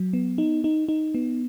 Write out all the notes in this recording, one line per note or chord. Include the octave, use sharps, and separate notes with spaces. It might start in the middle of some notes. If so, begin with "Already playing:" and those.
Already playing: F#3
B3
D#4
D#4
D#4
B3